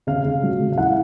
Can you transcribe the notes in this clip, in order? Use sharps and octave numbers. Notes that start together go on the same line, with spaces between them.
C#3 F5
C#3
F#3
C#3
F5
E4 F#5